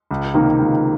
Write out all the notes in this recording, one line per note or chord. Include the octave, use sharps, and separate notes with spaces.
C#2
C3 D#3 A#3 D#4
C#2